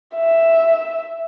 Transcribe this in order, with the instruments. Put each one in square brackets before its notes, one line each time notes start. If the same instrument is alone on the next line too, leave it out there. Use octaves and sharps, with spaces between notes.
[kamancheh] E5